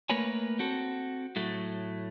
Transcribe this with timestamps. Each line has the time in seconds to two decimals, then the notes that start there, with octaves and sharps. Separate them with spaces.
0.10 A3 A#3 A#4 B4 C#5 G#5
0.59 C4 F#4 A4
1.36 A2 F#3 A3